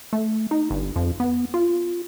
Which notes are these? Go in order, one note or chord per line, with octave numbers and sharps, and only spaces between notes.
A3
D#4
G1
F2
B3
F4